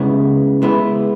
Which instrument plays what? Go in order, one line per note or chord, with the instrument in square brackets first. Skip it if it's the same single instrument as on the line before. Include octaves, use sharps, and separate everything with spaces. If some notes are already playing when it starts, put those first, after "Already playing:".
Already playing: [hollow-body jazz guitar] C#3 G#3 B3 E4
G#3 B3 E4 B4